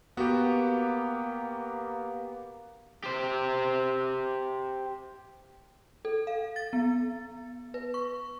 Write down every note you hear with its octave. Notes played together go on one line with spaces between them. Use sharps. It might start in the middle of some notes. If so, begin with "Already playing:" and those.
A#3 B3 F#4 G4
G4 C5
A4
F5
A6
B3
B4
C#6